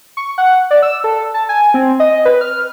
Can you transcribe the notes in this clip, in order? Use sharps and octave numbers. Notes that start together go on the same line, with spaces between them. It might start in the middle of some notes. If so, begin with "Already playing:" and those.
C#6
F#5
D5
E6
A4
A5
G#5
C4
D#5
B4
F6